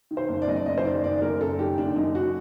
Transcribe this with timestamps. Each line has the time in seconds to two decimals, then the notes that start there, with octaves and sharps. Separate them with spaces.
0.11 D#3
0.17 C5
0.29 F#1
0.42 D5
0.47 F#2 D#5
0.56 D5
0.66 F#1 D#5
0.78 C5
0.85 D#3 D5
1.03 F#1 D5
1.22 F#2 A#4
1.40 F#1 A4
1.59 D#3 G4
1.78 F#1 D4
1.96 F#2 D#4
2.15 F#4